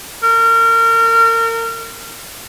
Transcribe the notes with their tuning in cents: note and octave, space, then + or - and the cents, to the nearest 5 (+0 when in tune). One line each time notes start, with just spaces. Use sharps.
A#4 -30